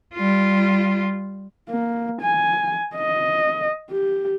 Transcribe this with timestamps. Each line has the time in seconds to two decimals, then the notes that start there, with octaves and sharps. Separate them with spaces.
0.15 G3 F4
1.69 A#3
2.21 G#5
2.95 D#5
3.90 G4